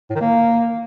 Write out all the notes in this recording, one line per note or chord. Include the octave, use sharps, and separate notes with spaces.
A2
D#3
A#3